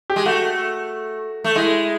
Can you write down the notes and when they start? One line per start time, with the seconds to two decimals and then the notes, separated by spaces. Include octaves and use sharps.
0.10 G4
0.16 G#3
0.25 A3 F#4
1.44 A3
1.55 G#3 E4